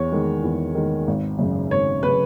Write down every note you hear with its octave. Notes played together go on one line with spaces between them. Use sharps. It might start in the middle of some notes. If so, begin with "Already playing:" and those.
Already playing: E2 C#5
D#3 G#3
E2
D#3 G#3
G#1
F#2 C#3
G#1 C#5
C#3 B4